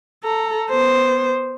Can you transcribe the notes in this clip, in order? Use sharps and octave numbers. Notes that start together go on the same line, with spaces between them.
A4 A#5
B3 C5